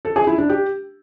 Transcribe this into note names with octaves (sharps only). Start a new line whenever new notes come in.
A4
G#4
E4
D4
G4